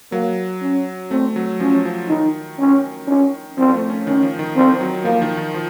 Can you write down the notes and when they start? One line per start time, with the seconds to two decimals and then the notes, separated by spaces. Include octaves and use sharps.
0.12 F#3 A#3
0.62 C#4
1.11 A3 C4
1.36 F#3
1.60 F3 C#4
1.85 F3
2.09 D#3 D#4
2.58 C#4
3.07 C#4
3.57 F3 C4
3.74 A3
3.90 C#4
4.06 D#3 C#4
4.23 F3
4.39 D#3
4.56 C4
4.81 F#3
5.04 F3 A#3
5.22 D#3
5.37 D#3
5.54 F3